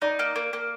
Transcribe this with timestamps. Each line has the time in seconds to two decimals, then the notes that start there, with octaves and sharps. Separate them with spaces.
0.02 D#4 D5
0.19 A#3
0.36 A#3
0.53 A#3